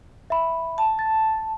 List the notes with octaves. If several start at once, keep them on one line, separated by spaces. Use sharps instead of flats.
E5 B5
A5
A6